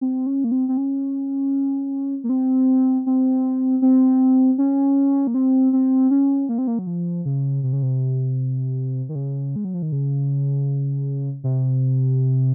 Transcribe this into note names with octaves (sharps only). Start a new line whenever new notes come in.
C4
C#4
A#3
C4
C4
C#4
A#3
C4
C4
C4
C#4
A#3
C4
C4
C#4
A#3
C4
A#3
F#3
F3
C#3
C3
C#3
C3
D#3
C#3
G#3
F#3
F3
D#3
C#3
C3